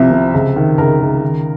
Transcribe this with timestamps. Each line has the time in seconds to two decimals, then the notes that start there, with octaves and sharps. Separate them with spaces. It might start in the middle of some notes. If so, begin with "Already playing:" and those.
Already playing: C2 C3 F3 E5
0.11 C3
0.34 C#2
0.56 D#3
0.78 C#2 A#4
1.01 C#2
1.22 D#3